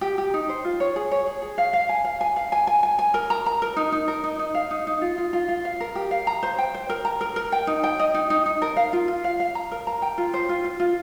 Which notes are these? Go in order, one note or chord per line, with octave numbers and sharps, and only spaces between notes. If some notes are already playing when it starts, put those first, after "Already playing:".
G4
G4
D#4
C5
F4
C#5
G#4
C#5
G#4
G#4
F5
F5
G#5
F5
G#5
F5
G#5
G#5
G#5
G#5
A#4
A#5
A#5
A#4
D#4
D#4
A#4
D#4
D#4
F5
D#4
D#4
F4
F4
F4
F4
F5
A#4
G4
F5
A#5
C5
G5
C5
A#4
A#5
A#4
A#4
G5
D#4
G5
D#5
D#4
D#4
D#4
A#4
F5
F4
F4
F5
F5
A#5
A#4
A#5
G5
F4
C5
F4
F4
F4